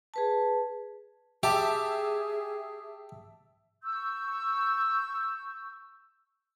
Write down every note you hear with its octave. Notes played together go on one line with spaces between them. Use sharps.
G#4 B4 A5
G4 G#4 E5 A5
C#6 E6 G6